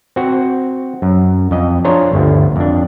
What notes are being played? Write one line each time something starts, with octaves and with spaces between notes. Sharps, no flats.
C4 F#4
F#2
F2 D#5
D4 F4 G#4 C5 C#5 A#5
G1 D2
F2 D4